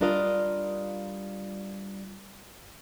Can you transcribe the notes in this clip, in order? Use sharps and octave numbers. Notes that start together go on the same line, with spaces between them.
G3 D4 F4 A#4 D#5 F5